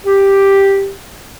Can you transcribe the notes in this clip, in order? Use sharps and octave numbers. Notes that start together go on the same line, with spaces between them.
G4